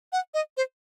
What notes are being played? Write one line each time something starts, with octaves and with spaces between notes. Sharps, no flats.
F#5
D#5
C5